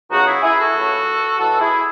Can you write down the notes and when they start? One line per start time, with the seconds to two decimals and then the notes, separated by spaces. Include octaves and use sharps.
0.10 C#2 C#3 F#3 A3 D#4 F#4
0.26 E4 G#4
0.42 E4 G#4
0.58 F#4 A4
0.74 C#2 C#3 F#3 A3
1.38 A2 E3 G#3 F#4 A4
1.59 E4 G#4